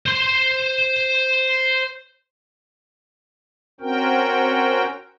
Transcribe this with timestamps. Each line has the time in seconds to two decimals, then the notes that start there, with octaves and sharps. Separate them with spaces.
0.06 C5 C6
3.81 C4 C#4 F#4 A#4 G5